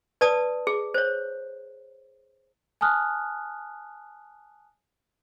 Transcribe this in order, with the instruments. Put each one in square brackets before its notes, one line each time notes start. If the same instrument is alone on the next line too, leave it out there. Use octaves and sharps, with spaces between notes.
[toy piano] B4 D5 A5 D#6
G#4
C5 C#5
[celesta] G#5 A5 D#6 F6 F#6